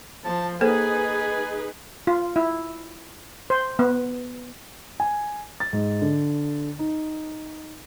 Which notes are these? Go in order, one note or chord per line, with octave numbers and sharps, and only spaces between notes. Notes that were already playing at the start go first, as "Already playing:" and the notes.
F3 A5
A#3 D#4 G#4 A4 B4 C5 G#5
F4
E4
C5
B3
G#5
A6
G#2
D3
D#4